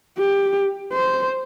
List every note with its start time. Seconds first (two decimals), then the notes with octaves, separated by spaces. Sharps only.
0.18 G4
0.92 C5